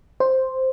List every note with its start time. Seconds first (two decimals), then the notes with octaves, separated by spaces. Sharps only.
0.20 C5